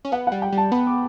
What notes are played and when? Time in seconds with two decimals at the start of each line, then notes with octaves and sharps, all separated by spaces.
0.05 C#4
0.12 B3 F#5
0.27 G3 F#5
0.42 G5
0.52 G3 A5
0.72 B3 B5
0.87 D6